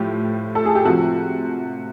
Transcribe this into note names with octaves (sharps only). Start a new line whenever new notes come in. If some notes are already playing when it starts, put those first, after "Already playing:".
Already playing: A2 F3 G4
A4
G#4
G4
C3 F3 F#4